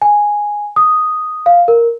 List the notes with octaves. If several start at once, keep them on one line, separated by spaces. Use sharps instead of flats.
G#5
D#6
F5
A#4